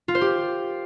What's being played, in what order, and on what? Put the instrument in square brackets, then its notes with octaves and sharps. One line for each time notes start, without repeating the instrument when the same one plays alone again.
[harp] F4
C5
G4